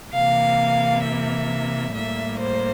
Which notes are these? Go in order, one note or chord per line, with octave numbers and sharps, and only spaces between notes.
C3 E3 A#3 F5
E5
A2 G3 A#3 E5
C5